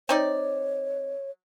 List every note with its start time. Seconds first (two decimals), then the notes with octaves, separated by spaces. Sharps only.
0.09 C4 D#4 C#5 D5